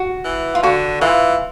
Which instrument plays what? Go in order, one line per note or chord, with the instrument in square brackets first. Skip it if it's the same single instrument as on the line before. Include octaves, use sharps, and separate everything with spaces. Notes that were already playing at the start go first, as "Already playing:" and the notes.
Already playing: [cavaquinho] F#4
[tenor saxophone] E3
[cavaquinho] F4
[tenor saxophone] D3 [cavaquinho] F#4
[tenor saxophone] E3 [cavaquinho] F4